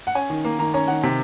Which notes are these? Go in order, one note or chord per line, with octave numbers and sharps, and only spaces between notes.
F#5
C#4 G#5
D#3
A#3
D#3 A#5
C#4 A#5
D#3 F#5
C3